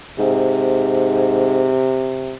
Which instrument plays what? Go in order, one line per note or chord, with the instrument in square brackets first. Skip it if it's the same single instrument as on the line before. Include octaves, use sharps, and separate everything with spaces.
[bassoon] G#2 [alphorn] C3